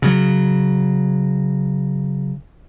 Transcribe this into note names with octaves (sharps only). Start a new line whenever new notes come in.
C#3 F#3